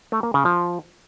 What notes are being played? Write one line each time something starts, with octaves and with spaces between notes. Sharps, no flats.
A3
A#3
C#3
F3